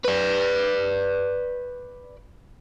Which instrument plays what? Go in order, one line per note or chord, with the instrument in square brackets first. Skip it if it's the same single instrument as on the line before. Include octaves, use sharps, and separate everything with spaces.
[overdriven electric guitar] B4 D5